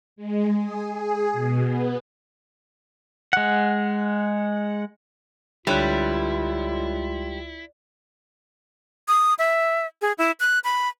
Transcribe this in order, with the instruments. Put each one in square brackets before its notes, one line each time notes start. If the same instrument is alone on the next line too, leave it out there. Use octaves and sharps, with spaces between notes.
[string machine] G#3
G#4
G#4
B2
B3
[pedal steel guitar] G#3 F#5
[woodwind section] C#2 F4 [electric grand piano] D3 C#5 F#6 [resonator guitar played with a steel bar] G3 [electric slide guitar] E4
[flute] D#6
E5
G#4
E4
F#6
B5